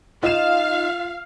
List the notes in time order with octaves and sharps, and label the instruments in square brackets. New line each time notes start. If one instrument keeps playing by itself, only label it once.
[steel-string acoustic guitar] D#4 D#5 [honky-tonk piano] F4 E7 [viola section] F5